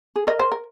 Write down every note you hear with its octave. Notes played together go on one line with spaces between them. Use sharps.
G#4
A#4 D#5
C5
A#4